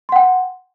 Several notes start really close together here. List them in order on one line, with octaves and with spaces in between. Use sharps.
C6 F#5 G5